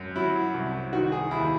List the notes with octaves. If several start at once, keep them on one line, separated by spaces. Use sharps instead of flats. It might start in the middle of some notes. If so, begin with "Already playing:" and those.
Already playing: F#2
F#3 E4
C2
D#3 F#4
G#4
D#2 E4